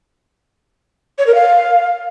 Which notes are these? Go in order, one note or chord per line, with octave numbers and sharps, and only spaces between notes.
C#5
A#4
F5